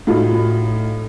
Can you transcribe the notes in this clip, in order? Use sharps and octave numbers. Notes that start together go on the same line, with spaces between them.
A2 D#4 F4 F#4